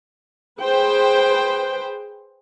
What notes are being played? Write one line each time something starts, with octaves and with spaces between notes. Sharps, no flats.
G#4 B4 C5 G5